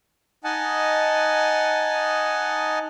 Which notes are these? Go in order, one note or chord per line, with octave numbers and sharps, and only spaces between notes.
D#4 D#5 F#5 G#5 A5